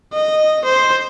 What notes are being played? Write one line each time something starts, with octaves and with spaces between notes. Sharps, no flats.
D#5
C5